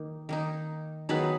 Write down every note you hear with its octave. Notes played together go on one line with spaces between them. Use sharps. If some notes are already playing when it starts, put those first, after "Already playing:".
Already playing: D#3 A#3 D#4
D#3 A#3 D#4
D#3 F#3 B3 D#4 G#4 B4